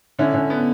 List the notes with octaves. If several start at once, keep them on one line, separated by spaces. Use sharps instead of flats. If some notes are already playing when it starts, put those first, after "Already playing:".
D3 C#4 E4
D3 C#4
B3